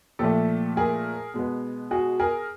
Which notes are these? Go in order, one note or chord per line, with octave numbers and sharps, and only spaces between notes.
A#2 F3 A3 G4 A4
G#4 A#4
B2 G#3 B3
F#4 G#4
G#4 A#4